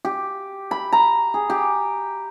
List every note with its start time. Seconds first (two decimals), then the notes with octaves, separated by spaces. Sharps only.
0.05 G4
0.71 B5
0.92 A#5
1.34 G#4
1.50 G4